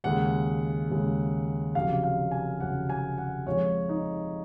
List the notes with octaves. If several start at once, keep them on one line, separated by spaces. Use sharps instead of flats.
D#2 C#3 G#3 F#5
D#2 C#3 G#3
F1 F2 C#3 F#3 F5
F5
G#5
F1 F2 C#3 F#3 F#5
G#5
F#5
F2 F3 G#3 C#5
D#4